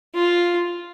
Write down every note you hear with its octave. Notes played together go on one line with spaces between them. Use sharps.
F4